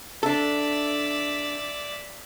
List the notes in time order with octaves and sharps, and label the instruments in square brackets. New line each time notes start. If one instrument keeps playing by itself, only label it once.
[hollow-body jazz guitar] D4 A4 [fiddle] D5 E5